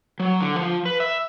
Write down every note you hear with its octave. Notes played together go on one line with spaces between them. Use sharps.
F#3
D3
F3
B4
E5